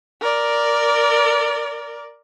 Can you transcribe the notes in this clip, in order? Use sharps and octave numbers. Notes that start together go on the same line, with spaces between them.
A#4 D5